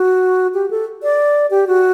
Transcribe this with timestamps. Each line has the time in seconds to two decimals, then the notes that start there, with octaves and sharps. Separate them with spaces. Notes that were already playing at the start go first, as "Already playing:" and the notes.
Already playing: F#4
0.54 G4
0.70 A4
1.03 D5
1.51 G4
1.67 F#4